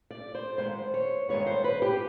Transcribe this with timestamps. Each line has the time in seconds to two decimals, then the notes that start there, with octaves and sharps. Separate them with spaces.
0.11 D5
0.35 C5
0.58 G2 D#3 G#3 B3 C5
0.94 C#5
1.29 G2 D#3 G#3 B3 C#5
1.46 C5
1.64 B4
1.82 G4